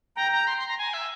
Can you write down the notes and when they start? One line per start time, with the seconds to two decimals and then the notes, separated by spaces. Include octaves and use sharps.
0.16 G5 A#5
0.32 A#5
0.47 C6
0.57 C6
0.68 A#5
0.78 G#5
0.94 E5